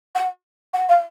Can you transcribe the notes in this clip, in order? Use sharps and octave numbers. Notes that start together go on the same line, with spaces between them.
F#5
F#5
F5